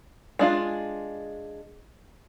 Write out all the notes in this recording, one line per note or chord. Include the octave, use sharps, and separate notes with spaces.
G#3 D4 F4